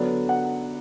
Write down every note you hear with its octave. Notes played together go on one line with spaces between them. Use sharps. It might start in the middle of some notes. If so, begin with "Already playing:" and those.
Already playing: D3 F#3 B3 D4
F#5